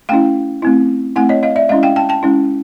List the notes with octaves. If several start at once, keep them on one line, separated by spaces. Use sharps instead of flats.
A3 C#4 E4 F5 G5
A3 C4 E4
A3 C4 E4 F#5 G#5
C#5 D#5
D#5 F5
D5 E5
G#3 C#4 E4 D#5 F5
F5 G5
G5 A5
G5 A5
G#3 C#4 E4